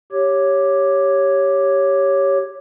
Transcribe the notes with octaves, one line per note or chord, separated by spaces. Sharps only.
G4 C#5